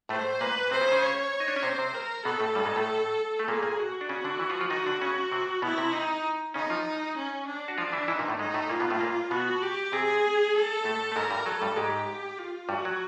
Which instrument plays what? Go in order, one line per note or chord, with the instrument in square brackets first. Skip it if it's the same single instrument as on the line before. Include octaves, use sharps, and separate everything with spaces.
[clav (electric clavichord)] A2 A3 [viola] C5
[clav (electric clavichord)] A#2 A#3 [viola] B4
[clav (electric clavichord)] C3 C4 [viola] C5
[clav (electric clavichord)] C#3 C#4
C#3 C#4
[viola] C#5
[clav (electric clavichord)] D#4
D4
C#4
[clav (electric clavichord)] C3 C4 [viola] C5
[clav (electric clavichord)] C3 C4
[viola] A#4
[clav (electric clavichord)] B2 B3 [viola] A4
[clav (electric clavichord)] A2 A3
G2 G3
G#2 G#3
A2 A3
A3
[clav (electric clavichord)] A#2 A#3 [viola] G#4
[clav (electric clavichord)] A#2 A#3
[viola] F#4
[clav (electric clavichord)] D4
[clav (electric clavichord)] C#3 C#4 [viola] F#4
[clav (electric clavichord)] D3 D4
E3 E4
F3 F4
F3 F4
[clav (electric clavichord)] D#3 D#4 [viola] F#4
[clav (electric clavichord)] D3 D4
C#3 C#4
C3 C4
[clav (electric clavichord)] B2 B3 [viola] E4
[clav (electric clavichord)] C3 C4
[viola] D#4
[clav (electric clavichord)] C#3 C#4 [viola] D#4
[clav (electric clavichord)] F3 F4
[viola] C#4
D4
[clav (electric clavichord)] F#4
[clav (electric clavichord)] F3 F4 [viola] D4
[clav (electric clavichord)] E3 E4
[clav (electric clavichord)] E3 E4 [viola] D#4
[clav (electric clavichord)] A#2 A#3
A2 A3
[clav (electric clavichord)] G#2 G#3 [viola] D#4
[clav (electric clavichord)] A2 A3
[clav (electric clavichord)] A#2 A#3 [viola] F4
[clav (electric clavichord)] B2 B3
A2 A3
A#2 A#3
[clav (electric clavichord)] B2 B3 [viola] F#4
[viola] G4
[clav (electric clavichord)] C3 C4 [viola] G#4
[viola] A4
[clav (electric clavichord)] A2 A3
A3
[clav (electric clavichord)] G#2 G#3 [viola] A#4
[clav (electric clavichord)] G2 G3
[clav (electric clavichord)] F#3 [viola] A4
[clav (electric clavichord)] G2 G3
[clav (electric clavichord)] G#2 G#3 [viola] G4
[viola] F4
[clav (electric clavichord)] G2 G3 [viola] F#4
[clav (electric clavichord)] F#3